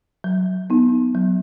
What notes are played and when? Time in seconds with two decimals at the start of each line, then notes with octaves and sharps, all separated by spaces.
0.24 F#3
0.70 B3 D#4
1.15 F#3